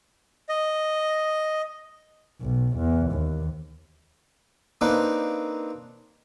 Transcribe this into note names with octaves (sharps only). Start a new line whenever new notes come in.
D#5
B1
E2
D#2
A#3 C4 D4 D#4 B4 D6